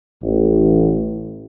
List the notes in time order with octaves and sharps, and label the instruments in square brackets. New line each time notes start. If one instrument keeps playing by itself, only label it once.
[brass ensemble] A1